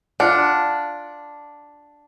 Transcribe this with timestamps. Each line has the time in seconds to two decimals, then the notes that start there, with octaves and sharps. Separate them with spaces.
0.20 D4 F4 F5 F#5